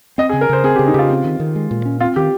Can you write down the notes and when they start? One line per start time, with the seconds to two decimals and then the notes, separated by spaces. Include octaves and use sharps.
0.18 C4 D#5
0.29 G#4
0.33 C#3
0.41 A#4
0.49 C#3 C5
0.64 C4 G#4
0.76 G4
0.79 C#3
0.87 D#4
0.94 C#3 F4 G4
1.10 C4
1.24 D#3
1.40 D#3
1.56 G#3
1.71 A#2
1.85 C#4
2.00 C4 F4
2.16 D#3 G4